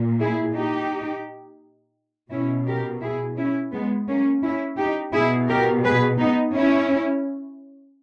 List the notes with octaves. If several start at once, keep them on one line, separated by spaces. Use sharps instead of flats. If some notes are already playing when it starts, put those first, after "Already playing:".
Already playing: A#2
E4 G#4
D#4 G4
B2 C#4 E4
G4 A#4
E4 G#4
C#4 E4
G#3 B3
A#3 C#4
C#4 E4
D#4 G4
B2 E4 G#4
G4 A#4
G#4 B4
B3 D#4
C#4 E4